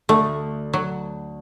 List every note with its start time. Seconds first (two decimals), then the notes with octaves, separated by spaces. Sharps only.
0.09 D2 D3 A3 D#6
0.73 F#3